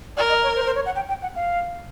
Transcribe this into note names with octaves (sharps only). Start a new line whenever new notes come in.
A#4 D5
D#5
C#5
C5
C5
C#5
F#5
G5
G5
F#5
F5